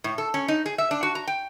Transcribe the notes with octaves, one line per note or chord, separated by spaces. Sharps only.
A2
A4
C#4
D#4
G#4
E5
D4
F#4
A#5
G5